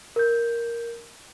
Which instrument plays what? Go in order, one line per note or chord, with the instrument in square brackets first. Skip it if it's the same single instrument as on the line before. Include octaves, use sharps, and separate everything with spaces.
[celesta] A#4 G6